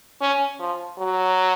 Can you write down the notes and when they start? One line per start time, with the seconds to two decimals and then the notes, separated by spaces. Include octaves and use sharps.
0.21 C#4
0.60 F3
0.98 F#3